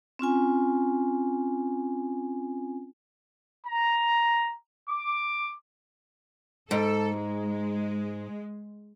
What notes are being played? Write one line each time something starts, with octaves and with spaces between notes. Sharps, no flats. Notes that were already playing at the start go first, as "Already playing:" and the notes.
C4 C#4 F4 G#5
A#5
D6
G#2 A4
G#3